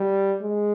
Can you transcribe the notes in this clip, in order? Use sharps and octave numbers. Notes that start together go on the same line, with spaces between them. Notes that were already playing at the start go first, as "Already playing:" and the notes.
Already playing: G3
G#3